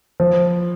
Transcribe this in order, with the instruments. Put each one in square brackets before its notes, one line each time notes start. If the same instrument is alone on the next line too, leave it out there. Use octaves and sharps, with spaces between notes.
[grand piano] F3